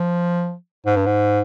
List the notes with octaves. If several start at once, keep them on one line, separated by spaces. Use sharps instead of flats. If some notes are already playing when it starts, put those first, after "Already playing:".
Already playing: F3
G#2
G2
G#2